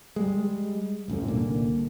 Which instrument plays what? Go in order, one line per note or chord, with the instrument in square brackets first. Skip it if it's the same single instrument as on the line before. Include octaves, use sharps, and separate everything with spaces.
[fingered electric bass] G3 G#3
E1 A1 F#2 A2
C2 A#2 D3 A#3